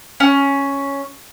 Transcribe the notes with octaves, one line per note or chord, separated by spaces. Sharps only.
C#4